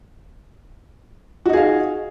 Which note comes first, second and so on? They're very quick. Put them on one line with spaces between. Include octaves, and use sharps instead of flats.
F#4 D#4 G#4 F5